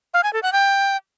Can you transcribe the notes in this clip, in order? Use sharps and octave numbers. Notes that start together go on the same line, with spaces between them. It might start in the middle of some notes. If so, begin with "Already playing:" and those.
F5
G#5
A4
F#5
G5